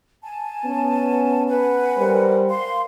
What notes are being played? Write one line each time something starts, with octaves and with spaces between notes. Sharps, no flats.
G#5 A5
B3 C#4
B4 F#5 G#5
G3 A#4 C5
F5 C6